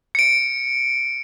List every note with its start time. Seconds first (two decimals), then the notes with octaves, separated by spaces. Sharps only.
0.15 C#7 D7